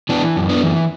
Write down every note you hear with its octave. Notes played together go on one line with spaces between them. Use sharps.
E3 B3 D4
F#2
B3 D4
E3